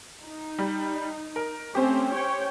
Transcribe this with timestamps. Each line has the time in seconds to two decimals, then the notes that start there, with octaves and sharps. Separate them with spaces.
0.24 D#4
0.59 G3
1.36 A#4
1.75 A3 C4 C#4 G4 C5
2.14 C#4 C#5 G5